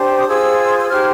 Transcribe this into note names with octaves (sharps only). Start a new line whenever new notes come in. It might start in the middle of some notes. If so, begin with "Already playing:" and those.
Already playing: D4 G4 C5
D#6
F4 G#4 C5 E6
E6
D#4 G4 C5 F6